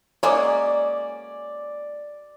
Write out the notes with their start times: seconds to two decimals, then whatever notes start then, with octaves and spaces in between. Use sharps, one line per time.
0.23 G#3 A#3 C#4 D5